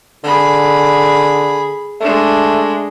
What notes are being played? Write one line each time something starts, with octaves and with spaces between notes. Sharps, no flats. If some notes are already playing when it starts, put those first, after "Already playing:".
D3 G#4 B5
G#3 A3 D4